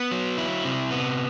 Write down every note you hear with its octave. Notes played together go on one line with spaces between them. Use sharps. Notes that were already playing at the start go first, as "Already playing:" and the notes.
Already playing: B3
F#3
E4
C3
B3